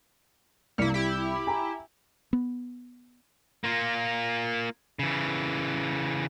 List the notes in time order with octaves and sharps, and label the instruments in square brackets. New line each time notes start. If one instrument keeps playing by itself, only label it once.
[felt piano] C2 D5 C#7 [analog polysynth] A#3 E4
[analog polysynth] E4 G4
[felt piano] G#5 A#5
[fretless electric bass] B3
[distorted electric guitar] A#3 F4
C#3 E3